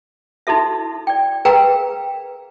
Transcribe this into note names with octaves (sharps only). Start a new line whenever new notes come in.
D#4 E4 F#4 A4 E5
D5 G5
G#4 A#4 B4 F5 G5 A#5